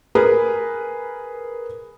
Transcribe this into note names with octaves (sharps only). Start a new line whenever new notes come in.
G#4 A#4 B4